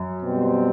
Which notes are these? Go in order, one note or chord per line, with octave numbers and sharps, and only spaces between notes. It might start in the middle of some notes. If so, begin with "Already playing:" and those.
Already playing: F#2
B2 G3 C4